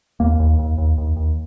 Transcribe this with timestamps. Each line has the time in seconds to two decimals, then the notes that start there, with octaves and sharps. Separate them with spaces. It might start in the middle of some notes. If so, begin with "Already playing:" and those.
0.20 D#2 A#3
0.40 D#2
0.59 D#2
0.78 D#2
0.98 D#2
1.16 D#2